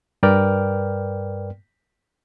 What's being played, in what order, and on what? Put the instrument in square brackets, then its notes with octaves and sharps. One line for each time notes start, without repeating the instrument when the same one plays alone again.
[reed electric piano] G2 A#4 B4 D5 G5 F6